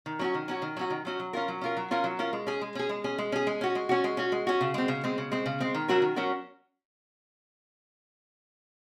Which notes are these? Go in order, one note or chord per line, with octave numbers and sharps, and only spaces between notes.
D#3
F#3 C#4 F#4
D#3
F#3 C#4 F#4
D#3
F#3 C#4 F#4
D#3
F#3 C#4 F#4
F#3
C#4 F4 A#4
F#3
C#4 F4 A#4
F#3
C#4 F4 A#4
F#3
C#4 F4 A#4
G#3
C#4 G#4
G#3
C#4 G#4
G#3
C#4 G#4
G#3
C#4 G#4
G#3
C#4 F#4
G#3
C#4 F#4
G#3
C#4 F#4
G#3
C#4 F#4
C#3
G#3 C4
C#3
G#3 C4
C#3
G#3 C4
C#3
G#3 C4
D#3
F#3 C#4 F#4 A#4
D#3
F#3 C#4 F#4 A#4